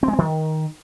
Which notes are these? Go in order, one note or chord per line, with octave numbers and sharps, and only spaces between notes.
C4
G#3
C4
D#3